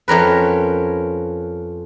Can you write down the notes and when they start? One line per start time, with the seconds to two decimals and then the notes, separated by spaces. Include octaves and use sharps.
0.08 F2 C#4 A#4 B4